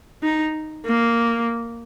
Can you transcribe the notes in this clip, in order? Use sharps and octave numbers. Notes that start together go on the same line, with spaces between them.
D#4
A#3